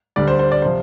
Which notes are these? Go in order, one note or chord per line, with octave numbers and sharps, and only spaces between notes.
D2 D3 G3 D5
C5
C5
D5
C3 F3 C5